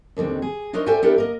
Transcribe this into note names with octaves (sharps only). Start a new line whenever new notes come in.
D#2 D3 D#3 G#3 C4
G#4
D4 D#4 A#4 C5 C#5 D#5
A4 C5 D5 E5 G5 G#5
B3 D4 E4 G4 A4 A#4
A#3 A#4 D#5